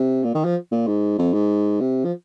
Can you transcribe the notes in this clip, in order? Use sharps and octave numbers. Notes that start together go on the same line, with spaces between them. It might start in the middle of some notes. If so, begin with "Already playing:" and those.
Already playing: C3
A#2
D#3
F3
A#2
G#2
F2
G#2
C3
F3